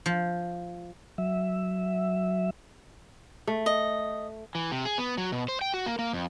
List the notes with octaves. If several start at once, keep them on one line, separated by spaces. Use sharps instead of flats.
F3
F#3 E5
A3
D#5
E3
C3
G#4
B3
F#3
B2
C5
G5
F#4
A#3
A#3
F2